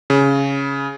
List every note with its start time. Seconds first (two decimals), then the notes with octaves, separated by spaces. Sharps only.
0.10 C#3